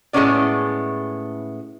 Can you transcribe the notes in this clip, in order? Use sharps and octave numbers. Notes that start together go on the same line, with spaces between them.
A2 G#3 A3 B3 C#4 D5